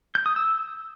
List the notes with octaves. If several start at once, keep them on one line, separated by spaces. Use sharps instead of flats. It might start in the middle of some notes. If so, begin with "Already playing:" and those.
G6
D#6
E6